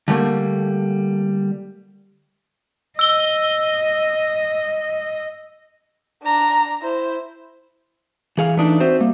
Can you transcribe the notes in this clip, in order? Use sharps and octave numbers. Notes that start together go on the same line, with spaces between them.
D3 G3 A3 A#3
D#5 E6 G7
D4 A#5
E4 C5
E3 G#4 F5
E3 A3 D4 D#4 D#6
C4 F#4 C5 E5
G3 A#3